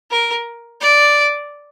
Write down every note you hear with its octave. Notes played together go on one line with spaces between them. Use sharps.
A#4
D5